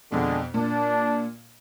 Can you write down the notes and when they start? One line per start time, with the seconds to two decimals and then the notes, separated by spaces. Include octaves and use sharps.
0.12 F2 B2 D3 G#3
0.54 A#2 D4